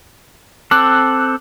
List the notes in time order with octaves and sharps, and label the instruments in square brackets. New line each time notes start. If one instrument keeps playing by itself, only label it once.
[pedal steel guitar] C4 A4 [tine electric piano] D6 [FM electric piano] F#6